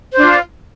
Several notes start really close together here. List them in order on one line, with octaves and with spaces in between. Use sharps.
C5 D4 F4